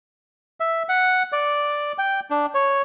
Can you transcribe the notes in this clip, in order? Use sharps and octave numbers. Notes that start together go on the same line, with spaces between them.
E5
F#5
D5
G5
D4
C#5